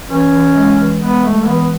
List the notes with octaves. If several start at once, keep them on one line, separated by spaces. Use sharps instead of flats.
E3 C#4
E3
G#3
E3
G#3 B3
G#3 A3
E3 B3